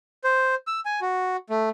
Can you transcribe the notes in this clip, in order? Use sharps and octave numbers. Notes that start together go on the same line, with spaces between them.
C5
E6
G#5
F#4
A3